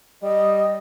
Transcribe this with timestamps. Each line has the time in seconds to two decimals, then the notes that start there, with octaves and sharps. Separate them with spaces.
0.23 G3 D#5